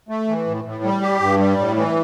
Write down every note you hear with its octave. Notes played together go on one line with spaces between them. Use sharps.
A3
E3
A2
A2
G3
G4
G2
G3
A2
E3